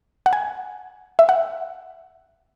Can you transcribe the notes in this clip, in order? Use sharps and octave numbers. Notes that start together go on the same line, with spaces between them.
F#5
G#5
E5
F#5